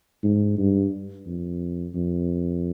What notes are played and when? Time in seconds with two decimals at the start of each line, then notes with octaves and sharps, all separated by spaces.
0.24 G#2
0.58 G2
1.26 F2
1.94 F2